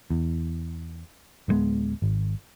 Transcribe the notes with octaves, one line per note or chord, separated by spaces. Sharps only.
E2
D1 G2 G#3 B3
G#1